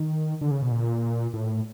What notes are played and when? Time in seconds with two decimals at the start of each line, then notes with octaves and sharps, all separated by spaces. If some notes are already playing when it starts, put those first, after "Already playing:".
Already playing: D#3
0.41 D3
0.51 C#3
0.62 B2
0.71 A#2
1.34 A2